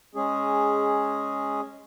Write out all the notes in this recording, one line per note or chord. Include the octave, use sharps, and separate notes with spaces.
G#3 C#4 G#4